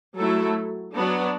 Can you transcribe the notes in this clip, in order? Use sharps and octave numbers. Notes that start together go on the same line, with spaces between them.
F#3 A3 E4 A4
F#3 B3 D4